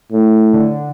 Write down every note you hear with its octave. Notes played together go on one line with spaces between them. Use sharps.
A2
D3